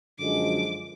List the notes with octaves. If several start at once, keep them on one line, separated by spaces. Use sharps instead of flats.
F#2 D3 F3 G#3 D6